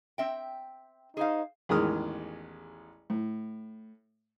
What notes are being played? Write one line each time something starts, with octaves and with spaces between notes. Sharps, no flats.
C4 E5 G5
D#4 G#4 C5 F5
A1 E2 D#3 G#3 D#6 F6
A2